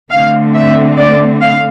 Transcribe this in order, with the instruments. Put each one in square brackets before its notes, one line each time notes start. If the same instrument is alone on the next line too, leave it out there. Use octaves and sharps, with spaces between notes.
[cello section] D3 A3 C4 F5
E5
D5
F5